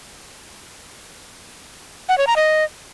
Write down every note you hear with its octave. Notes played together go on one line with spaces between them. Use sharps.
F#5
C#5
A#5
D#5